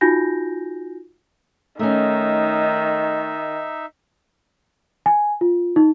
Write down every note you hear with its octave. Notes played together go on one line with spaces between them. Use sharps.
D#4 F4 F#4 G#5 G6 A#6
D#3 A3 C#4 D#4 E5
G#5
F4
D#4